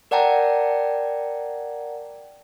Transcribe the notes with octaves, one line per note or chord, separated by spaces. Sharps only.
A#4 D5 F#5 G5 A5 A#5